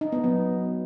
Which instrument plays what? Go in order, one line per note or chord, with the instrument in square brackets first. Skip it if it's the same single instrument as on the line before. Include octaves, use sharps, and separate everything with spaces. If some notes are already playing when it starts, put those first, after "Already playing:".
[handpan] D#4
B3
F#3